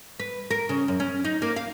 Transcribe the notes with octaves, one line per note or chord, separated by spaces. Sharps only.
B4
A#4
C#3
F#2
C#4
D#4
A#3
F5